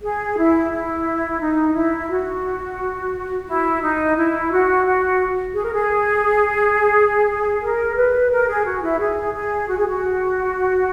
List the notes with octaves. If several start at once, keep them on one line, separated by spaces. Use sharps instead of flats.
G#4
E4
E4
D#4
E4
F#4
E4
D#4
E4
F#4
F#4
G#4
A#4
G#4
A#4
B4
A#4
G#4
F#4
E4
G#4
G#4
F#4
G#4
F#4